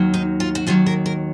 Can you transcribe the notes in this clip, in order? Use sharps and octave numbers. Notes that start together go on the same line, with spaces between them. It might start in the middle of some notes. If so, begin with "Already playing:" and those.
Already playing: D#2 D#3 F#3
D#4
F4
F#4
D#2 D#3 F#3 F4
A#4
A#4